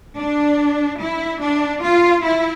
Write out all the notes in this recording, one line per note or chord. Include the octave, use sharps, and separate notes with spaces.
D4
E4
D4
F4
E4